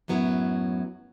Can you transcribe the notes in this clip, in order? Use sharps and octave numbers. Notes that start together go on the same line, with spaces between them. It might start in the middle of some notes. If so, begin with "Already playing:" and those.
F#2 A2 F#3 B3 E4